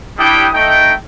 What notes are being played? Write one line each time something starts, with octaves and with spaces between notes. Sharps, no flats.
G3 D4 E4 G4 G5 D#6
A3 D#4 G5